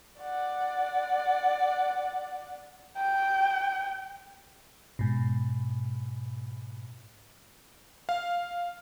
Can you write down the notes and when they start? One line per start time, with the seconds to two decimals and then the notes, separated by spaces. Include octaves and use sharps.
0.20 D5 F#5
2.98 G5
4.99 G#2 B2
8.09 F5